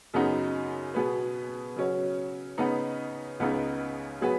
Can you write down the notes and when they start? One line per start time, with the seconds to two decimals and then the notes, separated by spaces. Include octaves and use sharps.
0.14 F#2 C#3 B3 D#4 F#4
0.94 B2 B3 G#4 B4
1.76 C#3 F#3 C#4
2.58 C#3 B3 D#4 B4
3.40 C#2 C#3 B3 D#4
4.21 F#3 B3 G#4 B4